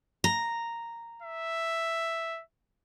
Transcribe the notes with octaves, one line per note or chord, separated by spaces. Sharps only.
A#5
E5